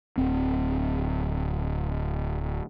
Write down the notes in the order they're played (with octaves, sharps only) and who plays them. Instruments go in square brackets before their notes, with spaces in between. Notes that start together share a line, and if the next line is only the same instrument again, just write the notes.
[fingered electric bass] D1 C4